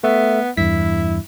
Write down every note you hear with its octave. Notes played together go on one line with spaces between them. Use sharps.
A3 B3 E5
E2 G2 E4 B6